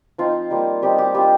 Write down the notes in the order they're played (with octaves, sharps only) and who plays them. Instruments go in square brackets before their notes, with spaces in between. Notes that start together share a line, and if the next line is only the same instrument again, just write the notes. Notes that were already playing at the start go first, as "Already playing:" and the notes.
[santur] F3 C4 D#4 F4
G3 A#3 F4
G3 C4 D#4 G4
G4
G3 D4 F4 G4